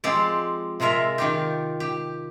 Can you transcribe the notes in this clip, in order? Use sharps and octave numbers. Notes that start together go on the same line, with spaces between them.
F3 G#3 C4 G4 D5
C3 G#3 F4 A#4 E5
D#3 F4 G4
G4